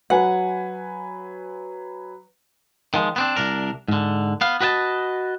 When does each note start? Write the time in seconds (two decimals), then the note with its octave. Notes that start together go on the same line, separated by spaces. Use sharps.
0.10 F#3 B4 F#5 G#5
2.94 D#3 F3 G#3
3.16 B3 C4 D4
3.36 C2 D4 A#4
3.88 G#2 D3
4.41 B3 F5
4.61 F#4 B4 D#5 G5 A5